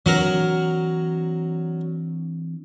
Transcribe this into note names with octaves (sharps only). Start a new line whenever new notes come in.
E3 F#3 C4 D4 F#4 A#4